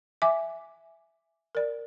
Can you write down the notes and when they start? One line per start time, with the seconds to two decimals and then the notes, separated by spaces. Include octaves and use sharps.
0.22 E5 G#5 D6
1.55 A#4 D5